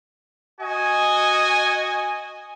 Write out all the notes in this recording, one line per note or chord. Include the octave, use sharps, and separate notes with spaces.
F#4 D#5 G#5